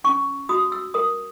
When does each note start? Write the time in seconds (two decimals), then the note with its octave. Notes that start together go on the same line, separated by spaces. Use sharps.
0.04 C#4 C#6
0.49 F#4 D#6
0.72 E6
0.94 A#4 D#6